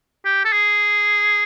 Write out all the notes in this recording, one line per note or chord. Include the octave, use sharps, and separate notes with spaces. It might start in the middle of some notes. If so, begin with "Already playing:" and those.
G4
A4
G#4